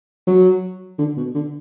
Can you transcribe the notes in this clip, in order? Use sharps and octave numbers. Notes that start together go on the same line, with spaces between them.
F#3
D3
B2
D3